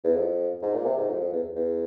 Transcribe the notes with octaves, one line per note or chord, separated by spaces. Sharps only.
E2
F2
G#2
A#2
C3
G#2
F2
F2
E2
E2